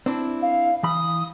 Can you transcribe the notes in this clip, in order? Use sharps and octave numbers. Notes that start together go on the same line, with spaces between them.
C4 D4 E4
F5
E3 B5 D#6